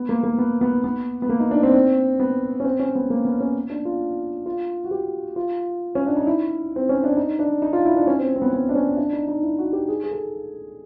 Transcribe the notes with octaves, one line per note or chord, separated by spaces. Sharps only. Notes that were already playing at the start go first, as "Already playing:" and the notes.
Already playing: B3
A#3
A#3
B3
B3
B3
B3
A#3
D#4
D4
C4
C4
B3
C#4
C4
C#4
B3
A#3
B3
C#4
D4
F4
F4
F#4
G4
F4
C#4
D4
D#4
E4
C4
C#4
D4
D#4
D4
D#4
F4
E4
D4
C#4
C4
C4
B3
B3
D4
C#4
D4
D#4
D#4
E4
F#4
G4
G#4
G#4
A4